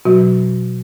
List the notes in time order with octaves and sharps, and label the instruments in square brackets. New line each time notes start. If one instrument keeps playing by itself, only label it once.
[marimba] B2 [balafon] F#3 F#4